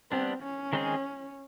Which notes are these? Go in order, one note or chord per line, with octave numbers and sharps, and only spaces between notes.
G3 B3 C4 D4
C#4
D#3 G#3 C4 D#4 G#4